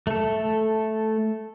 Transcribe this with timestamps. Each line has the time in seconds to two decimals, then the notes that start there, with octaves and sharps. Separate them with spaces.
0.07 A3 A4